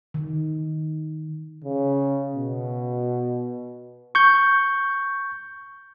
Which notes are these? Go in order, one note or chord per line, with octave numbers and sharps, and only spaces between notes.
D#3
C#3
B2
C#6 G6